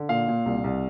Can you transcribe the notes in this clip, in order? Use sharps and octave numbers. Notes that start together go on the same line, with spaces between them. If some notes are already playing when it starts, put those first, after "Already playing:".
Already playing: D3
A#2 F5
A#2
C2
C2